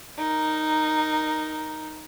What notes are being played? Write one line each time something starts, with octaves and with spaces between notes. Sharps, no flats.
D#4 A#4